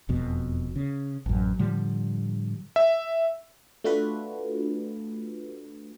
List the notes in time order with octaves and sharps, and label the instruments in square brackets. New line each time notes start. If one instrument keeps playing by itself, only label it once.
[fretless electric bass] E1 F2 B2
C#3
A1 F#2
A2 D3 F3 G3
[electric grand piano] E5
[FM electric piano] A3 D4 F4 F#4 A4 B4